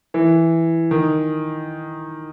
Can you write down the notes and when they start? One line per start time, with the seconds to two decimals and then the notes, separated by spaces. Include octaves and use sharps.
0.14 E3
0.91 D#3